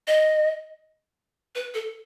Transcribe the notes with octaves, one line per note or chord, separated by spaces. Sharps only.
D#5
B4
A4